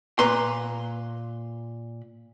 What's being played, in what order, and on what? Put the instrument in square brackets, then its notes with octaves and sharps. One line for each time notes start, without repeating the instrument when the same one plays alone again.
[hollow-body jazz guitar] A#2 B4 A#5 C6